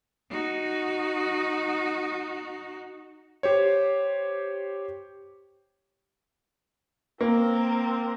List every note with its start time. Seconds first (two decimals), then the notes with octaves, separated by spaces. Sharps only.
0.31 D#4 F#4
3.43 G4 C5 C#5
7.21 A#3 C4 A#4